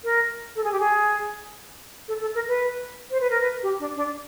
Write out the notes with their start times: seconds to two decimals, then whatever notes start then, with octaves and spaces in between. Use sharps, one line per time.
0.03 A#4
0.55 A4
0.63 G#4
0.71 G4
0.79 G#4
2.08 A4
2.21 A4
2.34 A#4
2.47 B4
3.10 C5
3.20 B4
3.30 A#4
3.41 B4
3.62 G4
3.79 D4
3.95 D4